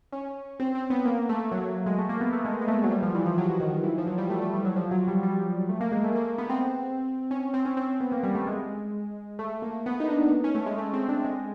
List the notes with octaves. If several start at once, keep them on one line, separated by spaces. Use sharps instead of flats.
C#4
C4
C4
B3
A#3
A3
F#3
G#3
A3
A#3
B3
A3
G#3
G#3
A3
F#3
G3
F3
E3
F3
F#3
D#3
E3
F3
F#3
G3
A3
A3
G3
F#3
F3
F#3
G3
G3
A3
A#3
G#3
A3
A#3
A#3
B3
C4
C#4
C4
C#4
C4
C4
B3
A#3
G3
A3
G#3
A3
A#3
B3
D#4
D4
C#4
A3
G#3
A3
C4
D4
G#3